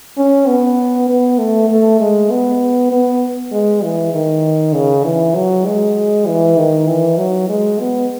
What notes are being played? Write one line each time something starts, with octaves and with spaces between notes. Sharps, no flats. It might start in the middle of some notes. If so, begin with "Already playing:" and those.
C#4
B3
B3
A3
A3
G#3
B3
B3
G#3
E3
D#3
C#3
E3
F#3
G#3
E3
D#3
E3
F#3
G#3
B3